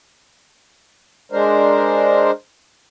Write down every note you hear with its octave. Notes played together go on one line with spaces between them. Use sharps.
G#3 D4 A#4 C5